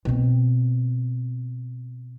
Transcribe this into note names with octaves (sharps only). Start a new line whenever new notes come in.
B2 C4